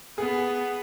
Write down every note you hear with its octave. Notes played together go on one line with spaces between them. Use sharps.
B3 G#4